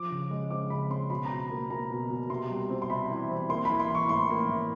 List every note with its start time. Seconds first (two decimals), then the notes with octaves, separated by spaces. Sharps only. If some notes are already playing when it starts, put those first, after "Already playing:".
Already playing: F3 D6
0.10 C#3
0.30 G#3
0.50 C4 D6
0.70 C#3 B5
0.90 C4 C6
1.10 B2 B5
1.25 A#5
1.30 B2
1.50 A#3
1.70 A#3 A#5
1.90 B2
2.10 B2
2.30 C3 C6
2.50 G3
2.70 C4
2.82 C6
2.90 C3 B5
3.10 E3
3.30 C4
3.49 A#3 C6
3.65 E3 B5
3.80 C6
3.90 E3
3.95 C#6
4.09 A2 C6
4.30 A#3
4.49 A2